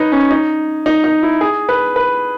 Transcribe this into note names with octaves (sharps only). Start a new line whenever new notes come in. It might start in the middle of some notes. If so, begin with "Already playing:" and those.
Already playing: D#4 B4 C#5
C#4
D#4
D#4
D#4
E4
G#4
B4
B4